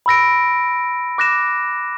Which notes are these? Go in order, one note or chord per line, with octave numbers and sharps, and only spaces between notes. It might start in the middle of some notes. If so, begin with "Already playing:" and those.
B5 E6 A#6 D7
D6 F#6 A#6 E7